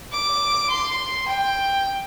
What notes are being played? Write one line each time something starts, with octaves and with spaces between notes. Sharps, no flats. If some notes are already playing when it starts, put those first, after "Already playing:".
D6
C6
G5